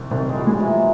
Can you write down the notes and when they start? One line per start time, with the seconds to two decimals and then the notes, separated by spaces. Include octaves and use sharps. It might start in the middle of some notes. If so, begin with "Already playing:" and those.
Already playing: C2
0.11 C2 D#3
0.29 G#3
0.35 F3 G3
0.47 G#3
0.60 E3 F#3